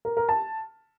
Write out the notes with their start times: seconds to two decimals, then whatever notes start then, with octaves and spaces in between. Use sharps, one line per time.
0.05 A#4
0.17 A#4
0.29 A5